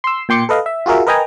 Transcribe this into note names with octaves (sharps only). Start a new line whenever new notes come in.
C6 E6
A#2 G5 C6 D6 C#7
A4 B4 D#5 F5
E5
F4 F#4 G#4 A#4 E5
A#4 B4 D#5 G5 G#5 A#5